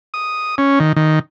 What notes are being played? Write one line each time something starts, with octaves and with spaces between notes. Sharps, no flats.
D#6
C#4
D#3
D#3